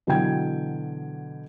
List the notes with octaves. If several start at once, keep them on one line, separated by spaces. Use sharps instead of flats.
B2 D3 E3 F#3 G5 G#6